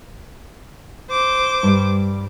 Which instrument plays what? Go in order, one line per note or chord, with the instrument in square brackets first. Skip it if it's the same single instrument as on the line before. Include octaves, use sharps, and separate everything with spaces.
[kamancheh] C5 D6
[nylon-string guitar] G2 G3